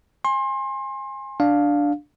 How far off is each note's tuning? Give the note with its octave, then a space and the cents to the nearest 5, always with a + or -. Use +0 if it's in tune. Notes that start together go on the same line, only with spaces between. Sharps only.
G#5 -15 C6 +30
D4 +0 F5 +10